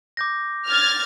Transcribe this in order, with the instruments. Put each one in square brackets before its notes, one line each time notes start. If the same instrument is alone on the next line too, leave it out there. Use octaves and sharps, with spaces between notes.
[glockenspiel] D6 G6 A#6
[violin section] F6 G#6 A6